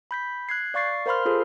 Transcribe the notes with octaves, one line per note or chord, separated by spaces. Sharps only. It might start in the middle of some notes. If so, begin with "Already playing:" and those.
B5 G6 B6
F#6 G#6 C7
D5 F5 C#6 A6 C7
A#4 C5 F5 B5 C6 F6
F4 G#4 A4 C5